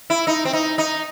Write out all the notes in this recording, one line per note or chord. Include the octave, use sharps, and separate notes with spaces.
E4
D#4
C4
D#4
D#4